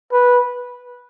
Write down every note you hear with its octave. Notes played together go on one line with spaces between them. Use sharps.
B4